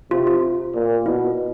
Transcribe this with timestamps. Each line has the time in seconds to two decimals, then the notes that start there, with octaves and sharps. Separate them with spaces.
0.11 C3 F4
0.27 F4
0.74 A#2
1.06 B2 E4